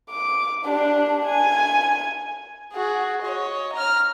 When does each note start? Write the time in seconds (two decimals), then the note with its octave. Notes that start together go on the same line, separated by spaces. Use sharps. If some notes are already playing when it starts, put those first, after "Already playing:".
0.10 D6
0.65 D4 G4
1.25 G#5
2.73 F#4 G#4
3.22 C#5 D#5
3.73 A#5 F6